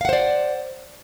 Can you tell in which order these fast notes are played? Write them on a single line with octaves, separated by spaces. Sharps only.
F5 F#5 C5 D5